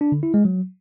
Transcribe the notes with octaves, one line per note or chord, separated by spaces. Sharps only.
D4
D3
E4
G#3
F#3